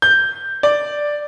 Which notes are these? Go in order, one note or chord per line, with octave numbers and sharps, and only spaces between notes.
G6
D5